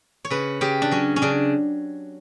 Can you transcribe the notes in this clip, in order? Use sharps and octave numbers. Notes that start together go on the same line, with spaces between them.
C#5
C#3 B4
C#3 G4
D4
F#3 C#4
C#4
C#3 D4